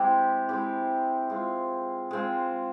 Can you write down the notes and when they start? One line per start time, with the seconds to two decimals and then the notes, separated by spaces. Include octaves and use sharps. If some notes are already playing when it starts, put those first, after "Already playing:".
Already playing: G#3 C4 E4 G4
0.49 G#3 C4 E4 G4
1.30 G#3 C4 F4
2.11 G#3 C4 F4